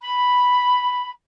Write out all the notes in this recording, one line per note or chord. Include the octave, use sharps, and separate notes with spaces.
B5